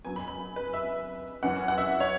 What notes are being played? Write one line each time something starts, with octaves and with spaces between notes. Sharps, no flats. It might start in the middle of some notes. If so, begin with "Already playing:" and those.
F#2 F#3 B3 G#5
B5
B5
B4
E5
F#2 E3 C#4 F#5
F#5
E5
C#5